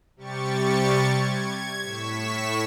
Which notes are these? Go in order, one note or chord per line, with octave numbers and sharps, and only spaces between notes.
C3 G3 G4 C#6 A6 C#7
G#6
A2 C#6 B6 E7